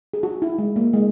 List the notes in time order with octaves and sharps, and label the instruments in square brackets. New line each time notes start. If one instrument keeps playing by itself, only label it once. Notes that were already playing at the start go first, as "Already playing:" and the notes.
[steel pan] G#4
F#4
E4
G#3
A#3
G#3